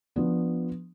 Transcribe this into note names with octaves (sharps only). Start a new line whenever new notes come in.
F3 B3 D4